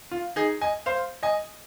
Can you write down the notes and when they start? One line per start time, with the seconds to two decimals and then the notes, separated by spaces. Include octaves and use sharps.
0.11 F4
0.36 D#4 G#4
0.61 D#5 G#5
0.86 C5 F5
1.23 D#5 G#5